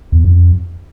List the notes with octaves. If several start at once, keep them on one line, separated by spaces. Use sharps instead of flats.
E2
F2